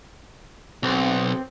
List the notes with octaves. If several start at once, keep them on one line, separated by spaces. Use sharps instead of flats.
B1 C4